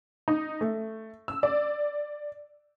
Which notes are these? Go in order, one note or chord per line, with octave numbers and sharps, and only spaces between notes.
D#4
A3
E6
D5